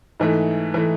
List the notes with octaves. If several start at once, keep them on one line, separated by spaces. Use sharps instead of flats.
G#2 E3 A3
E3 A3